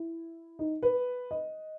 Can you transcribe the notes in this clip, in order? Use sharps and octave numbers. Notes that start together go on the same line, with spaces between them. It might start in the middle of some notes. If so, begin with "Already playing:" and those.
Already playing: E4
D#4
B4
D#5